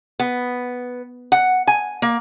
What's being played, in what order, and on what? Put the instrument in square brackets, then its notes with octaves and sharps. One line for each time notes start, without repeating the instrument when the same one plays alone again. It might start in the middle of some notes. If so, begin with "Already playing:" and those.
[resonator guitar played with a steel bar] B3
F#5
G#5
A#3